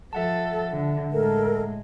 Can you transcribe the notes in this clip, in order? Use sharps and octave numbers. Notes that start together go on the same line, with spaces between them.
F3 A4 E5 F#5 A5
D3
A2 G#3 A4 A#4